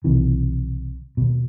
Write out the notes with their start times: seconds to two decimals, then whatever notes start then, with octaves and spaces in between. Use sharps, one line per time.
0.04 B1 C3 D#3 E3
1.17 D#2 B2